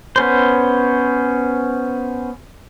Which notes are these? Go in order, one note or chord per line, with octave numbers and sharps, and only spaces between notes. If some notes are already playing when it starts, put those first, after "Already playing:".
B3 C#4 C5